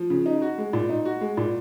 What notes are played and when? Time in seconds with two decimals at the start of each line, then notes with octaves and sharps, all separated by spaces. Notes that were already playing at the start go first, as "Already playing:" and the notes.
Already playing: F3
0.10 C#3
0.26 D#4
0.42 F#4
0.58 G#3
0.73 A#2
0.89 D#4
1.05 F#4
1.21 G#3
1.37 A#2